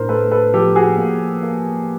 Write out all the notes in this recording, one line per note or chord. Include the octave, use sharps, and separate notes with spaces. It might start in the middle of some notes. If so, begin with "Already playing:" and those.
Already playing: A2 D4 A#4 C5
A3 A4 B4
A4 B4
F3 G4 A4
F#4 G#4
A#3
A#3